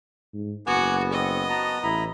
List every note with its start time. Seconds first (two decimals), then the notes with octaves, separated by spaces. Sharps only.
0.33 G#2
0.67 F#1 B3 F#4 F#5 G#5 D6
1.13 C4 D#5
1.50 F#4 A5 A#5
1.83 A1 E4 A#5 B5